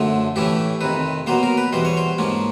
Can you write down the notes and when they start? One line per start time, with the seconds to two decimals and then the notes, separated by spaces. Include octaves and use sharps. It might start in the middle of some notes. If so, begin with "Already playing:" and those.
Already playing: F#2 D3 F3 A3
0.36 A2 E3 A3 C#4 G4
0.81 F2 C3 D#3 B4
1.27 B2 F#3 A#3 C5
1.43 A#4
1.57 B4
1.73 E2 B2 G3 C5
1.85 C#5
1.97 C5
2.18 G#2 F3 A#3 C#4